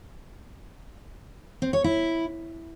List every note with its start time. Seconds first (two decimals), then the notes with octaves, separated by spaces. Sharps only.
1.62 C4
1.73 C#5
1.84 E4